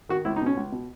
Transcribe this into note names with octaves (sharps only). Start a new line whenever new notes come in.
D#3 F#4
C#2 E4
D#4
B2 C#4
C#2
B2